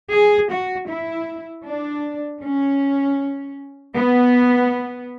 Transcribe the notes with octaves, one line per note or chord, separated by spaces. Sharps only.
G#4
F#4
E4
D4
C#4
B3